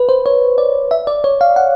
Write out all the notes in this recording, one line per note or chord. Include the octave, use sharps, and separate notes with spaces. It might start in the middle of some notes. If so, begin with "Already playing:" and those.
Already playing: B4
C5
C#5
D5
E5
D5
C#5
F5
F#5